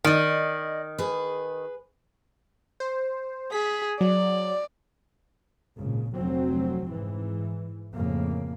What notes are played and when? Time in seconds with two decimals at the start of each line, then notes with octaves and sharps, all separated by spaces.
0.04 D#3 D5 D#5
0.98 G#4 B4
2.80 C5
3.52 G#4 B6
4.01 F#3 D5
5.79 G#1 A#2 C#3
6.16 F1 D2 F#3 C4
6.90 G#2 E3
7.95 F2 A2 C#3 A#3